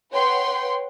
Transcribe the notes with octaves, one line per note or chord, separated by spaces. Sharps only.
B4 C#5 F#5 G5 C6